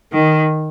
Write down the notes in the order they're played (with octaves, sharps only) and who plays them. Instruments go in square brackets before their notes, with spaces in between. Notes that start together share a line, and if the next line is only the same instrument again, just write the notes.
[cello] D#3